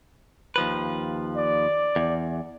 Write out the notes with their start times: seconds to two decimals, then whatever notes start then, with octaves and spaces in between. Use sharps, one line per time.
0.56 D#2 F3 B4
1.37 D5
1.96 E2